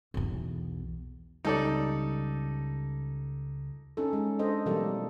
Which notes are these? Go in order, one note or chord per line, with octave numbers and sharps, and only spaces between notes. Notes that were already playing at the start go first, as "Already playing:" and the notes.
B1 E2
C#2 G3 D#4 A4 D5
C#4 D#4 A4
G#3
D4 A4 C5 D#5
B2 E3 F#3 G3 A#3 A4